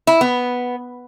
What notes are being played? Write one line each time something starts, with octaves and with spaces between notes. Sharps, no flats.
E4
B3